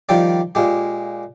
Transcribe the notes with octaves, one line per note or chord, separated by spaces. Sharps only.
D#3 F3 G3 G4 D5
A#2 G#3 G4